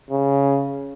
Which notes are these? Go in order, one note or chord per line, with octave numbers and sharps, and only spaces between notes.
C#3